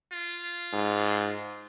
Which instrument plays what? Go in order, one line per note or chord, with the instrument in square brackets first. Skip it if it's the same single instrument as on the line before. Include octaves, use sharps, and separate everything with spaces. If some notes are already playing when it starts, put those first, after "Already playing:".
[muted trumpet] F4
[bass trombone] G#2